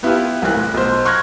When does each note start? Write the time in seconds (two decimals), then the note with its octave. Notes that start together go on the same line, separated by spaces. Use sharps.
0.03 B3 E4 F4 G4 B4
0.42 C2 E3 C4 F#6
0.55 A2
0.74 B1 C5
1.05 C6 C#6 F6 F#6 G#6 A#6